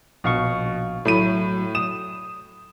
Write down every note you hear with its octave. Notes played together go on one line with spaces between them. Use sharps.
A#1 B2 F5 C#6
A2 F#3 A3 B5 D#7
D#6 E7